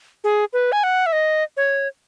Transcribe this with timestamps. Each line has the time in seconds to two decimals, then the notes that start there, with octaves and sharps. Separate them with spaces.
0.24 G#4
0.53 B4
0.72 G#5
0.84 F#5
1.06 E5
1.13 D#5
1.57 C#5